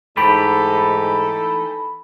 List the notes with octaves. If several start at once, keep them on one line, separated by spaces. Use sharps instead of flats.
G#2 E3 A3 D#4 G4 A4 B5